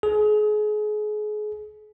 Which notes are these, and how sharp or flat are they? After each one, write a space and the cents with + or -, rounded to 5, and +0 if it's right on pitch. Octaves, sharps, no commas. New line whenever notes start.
G#4 +30